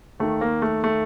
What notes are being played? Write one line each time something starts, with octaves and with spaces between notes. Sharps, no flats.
D#2 D#3 A3
A#3
A3
A3